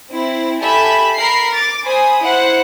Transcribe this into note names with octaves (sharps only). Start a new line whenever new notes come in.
C4 E4
G4 A4 E5 G#5 B5
A#4 B5 C7
D6 A6
C5 G#5 B5 D#6
E4 C5 F#5